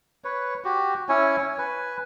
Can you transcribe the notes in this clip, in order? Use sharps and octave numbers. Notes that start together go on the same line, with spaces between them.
B4 C#5
F#4 G4
C#4 E4 C#5 G#5
C#5
B4 G#5